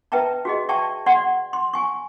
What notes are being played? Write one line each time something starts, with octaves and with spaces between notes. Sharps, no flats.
B4 E5 G5 A5 A#5
F#4 G#4 D#5
D5 E5 G5 A5 C#6
D5 F#5 C6
C6
G#5 C#6